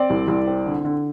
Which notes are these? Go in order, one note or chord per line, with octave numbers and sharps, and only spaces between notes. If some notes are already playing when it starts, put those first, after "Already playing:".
Already playing: C4 D5
C2
C2
C4
D3
D3